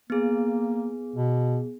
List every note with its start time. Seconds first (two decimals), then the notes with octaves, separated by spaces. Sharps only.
0.10 A#3 B3 G#4
1.16 B2